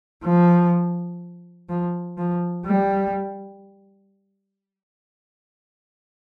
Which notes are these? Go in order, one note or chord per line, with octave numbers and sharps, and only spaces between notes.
F3
F3
F3
G3